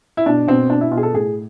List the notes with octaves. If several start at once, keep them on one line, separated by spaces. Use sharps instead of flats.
E4
B2 D4
B2 C4
B2 D4
E4
B2 F4
G#4
A4
A2 G#4